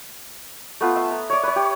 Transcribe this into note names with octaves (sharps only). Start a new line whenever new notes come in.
A3 B3 F4
E5
A#5
C#5 D5
B4 C#5
G4